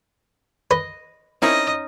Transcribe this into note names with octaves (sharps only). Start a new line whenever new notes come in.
B4 D#5
C4 C#4 D#4 E4 A#4 D#5